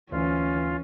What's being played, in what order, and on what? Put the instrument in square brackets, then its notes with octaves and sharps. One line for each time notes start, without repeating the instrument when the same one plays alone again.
[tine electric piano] D2 [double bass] E3 [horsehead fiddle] C#4 [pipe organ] F4